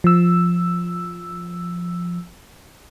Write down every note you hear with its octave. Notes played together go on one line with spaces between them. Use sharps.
F3 E6